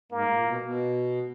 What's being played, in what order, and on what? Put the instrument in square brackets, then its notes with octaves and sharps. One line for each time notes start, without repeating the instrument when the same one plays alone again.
[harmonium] G#2 [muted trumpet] A#3
[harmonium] A#2
A#2
B2
B2